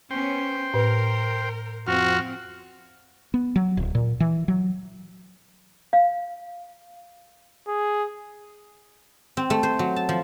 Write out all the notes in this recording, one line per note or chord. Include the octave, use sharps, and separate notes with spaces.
B3 C#4 C5 G5
A2 A#4 B4
F2 C4 F4 F#4 F6
B3
F#3
D1
A#2
E3
F#3
F5
G#4
C4
A3
C5
F#3
A5
F3